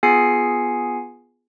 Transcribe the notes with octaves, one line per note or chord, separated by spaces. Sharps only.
B3 F4 G#4 G#5 C7 C#7